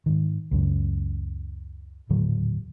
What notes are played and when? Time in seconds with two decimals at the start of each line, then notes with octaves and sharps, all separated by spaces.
0.06 G#2 D#3
0.51 C#2 F#2 C#3
2.10 D#1 A2 D3 F#3